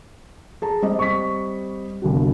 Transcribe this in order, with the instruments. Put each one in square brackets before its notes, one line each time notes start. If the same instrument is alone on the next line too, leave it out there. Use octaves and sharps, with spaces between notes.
[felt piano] G#4 A5 A#5
G3 C4 D#5
[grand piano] C#6 B6
G1 C2 F#4